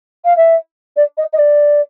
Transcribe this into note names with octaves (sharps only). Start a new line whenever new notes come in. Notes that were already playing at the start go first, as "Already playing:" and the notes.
F5
E5
D5
D#5
D#5
D5